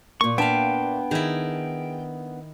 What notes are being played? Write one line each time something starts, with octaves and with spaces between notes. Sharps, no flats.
A#2 A#3 C#6
B3 D4 E5 F5 G5 A5
D#3 E4 G#4